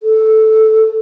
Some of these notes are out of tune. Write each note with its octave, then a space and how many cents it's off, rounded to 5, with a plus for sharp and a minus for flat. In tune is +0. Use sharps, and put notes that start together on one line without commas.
A4 -5